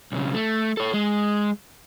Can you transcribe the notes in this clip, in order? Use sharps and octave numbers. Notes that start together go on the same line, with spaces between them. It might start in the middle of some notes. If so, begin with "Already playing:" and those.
B1 C#3
A3
A4 C#5
G#3